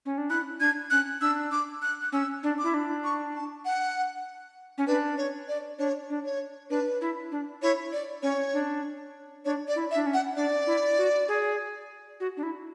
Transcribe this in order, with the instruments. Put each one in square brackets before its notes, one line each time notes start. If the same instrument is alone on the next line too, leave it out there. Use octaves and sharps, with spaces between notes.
[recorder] C#4
D4
[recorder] E4 [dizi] F#6
[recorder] D4 [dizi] G#6
[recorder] C#4 [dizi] F#6
[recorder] D4 [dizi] E6
[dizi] D6
F#6
F#6
[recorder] C#4 [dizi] E6
[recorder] D4
[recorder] E4 [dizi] D6
[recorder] D4
[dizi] C#6
A5
F#5
[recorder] C#4
[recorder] D4 [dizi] B4
[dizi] C#5
D5
[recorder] D4 [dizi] C#5
[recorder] D4
[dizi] C#5
[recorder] D4 [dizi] B4
[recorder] E4
D4
[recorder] E4 [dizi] C#5
[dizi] D5
[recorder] C#4 [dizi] C#5
[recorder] D4
[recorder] D4 [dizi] C#5
[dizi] D5
[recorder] E4
[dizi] E5
[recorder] D4
C#4
[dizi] F#5
[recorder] D4 [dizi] D5
[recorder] E4
F#4
G#4
F#4
D4
E4